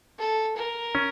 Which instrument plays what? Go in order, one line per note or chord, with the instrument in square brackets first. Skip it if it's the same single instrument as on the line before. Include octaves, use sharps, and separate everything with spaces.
[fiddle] A4
A#4
[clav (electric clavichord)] C#4